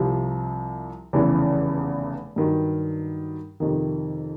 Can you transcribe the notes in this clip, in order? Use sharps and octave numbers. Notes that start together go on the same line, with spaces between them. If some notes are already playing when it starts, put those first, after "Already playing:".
Already playing: C2 C3 F3
F1 E2 C#3 E3
G2 D#3 F#3
F2 C3 D#3